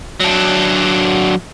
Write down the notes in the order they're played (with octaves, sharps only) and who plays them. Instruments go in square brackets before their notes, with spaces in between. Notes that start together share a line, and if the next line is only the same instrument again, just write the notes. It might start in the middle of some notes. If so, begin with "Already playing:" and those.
[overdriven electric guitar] F#3 D4